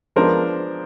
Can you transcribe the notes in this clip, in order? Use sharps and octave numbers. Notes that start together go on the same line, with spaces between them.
F3 G#3 B3 D4 A#4 C5